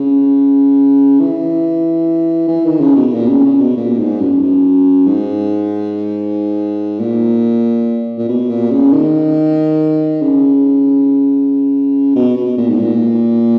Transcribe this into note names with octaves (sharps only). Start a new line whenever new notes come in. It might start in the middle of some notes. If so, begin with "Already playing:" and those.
Already playing: C#3
E3
E3
D#3
C#3
B2
A#2
C#3
C#3
B2
A#2
G#2
F#2
F#2
G#2
A#2
A#2
B2
A#2
C#3
D#3
C#3
B2
B2
A#2
G#2
A#2